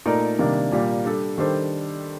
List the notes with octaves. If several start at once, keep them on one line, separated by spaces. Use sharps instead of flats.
A#2 A3 D#4 A#4 D5
C3 D#3 G3 A#3 D4
A#2 G3 A#3
G3 D4 A4
D#3 G3 D4 A4 C5